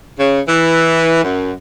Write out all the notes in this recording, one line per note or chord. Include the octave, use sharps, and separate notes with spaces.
C#3
E3
F#2